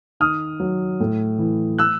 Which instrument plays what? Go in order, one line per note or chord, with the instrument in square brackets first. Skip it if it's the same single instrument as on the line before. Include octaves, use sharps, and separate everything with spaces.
[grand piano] D#3 D#6 F6
F#3
A2
E3
E6 F#6